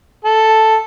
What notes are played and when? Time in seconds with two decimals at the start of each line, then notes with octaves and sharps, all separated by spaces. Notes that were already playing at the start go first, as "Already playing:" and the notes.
0.25 A4